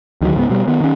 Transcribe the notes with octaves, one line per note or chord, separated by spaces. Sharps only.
D2 D#3 E3 F#3
C#2 G#2 B3
B2 G3
D#3 B3
D#3 C#4